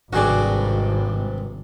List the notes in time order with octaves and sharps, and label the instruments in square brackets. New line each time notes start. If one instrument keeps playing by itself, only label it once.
[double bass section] G#1 [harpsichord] G2 C3 [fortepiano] F#4 G#4 D5